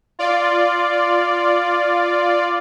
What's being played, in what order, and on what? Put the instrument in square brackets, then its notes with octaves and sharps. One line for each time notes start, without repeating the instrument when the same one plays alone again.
[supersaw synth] F4 D5